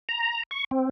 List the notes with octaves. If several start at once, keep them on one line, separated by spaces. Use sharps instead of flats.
A#5
C#6
C4